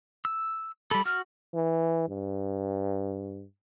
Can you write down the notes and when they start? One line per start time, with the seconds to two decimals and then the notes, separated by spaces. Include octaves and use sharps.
0.25 E6
0.91 G3 A4 B5
1.05 F#4 F6
1.54 E3
2.08 G2